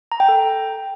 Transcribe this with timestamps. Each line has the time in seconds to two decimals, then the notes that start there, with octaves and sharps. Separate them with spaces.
0.12 A#5
0.20 G5
0.28 A4